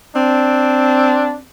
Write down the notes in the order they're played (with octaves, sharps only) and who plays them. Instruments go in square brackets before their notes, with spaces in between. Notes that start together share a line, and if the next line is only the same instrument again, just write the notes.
[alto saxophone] C4 [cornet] D4